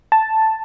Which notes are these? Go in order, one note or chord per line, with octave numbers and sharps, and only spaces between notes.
A5